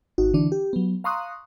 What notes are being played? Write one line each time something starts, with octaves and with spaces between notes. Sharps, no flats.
G#1 D#4 F#4
D3 E3 D4
G4
F#3 B3
F5 A#5 C6 C#6 D#6 F#6